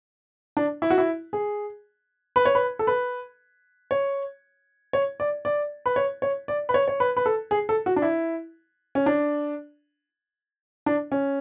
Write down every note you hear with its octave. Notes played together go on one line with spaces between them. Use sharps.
D4
E4
F#4
E4
G#4
B4
C#5
B4
A4
B4
C#5
C#5
D5
D5
B4
C#5
C#5
D5
B4
C#5
C#5
B4
B4
A4
G#4
A4
F#4
D4
E4
C#4
D4
D4
C#4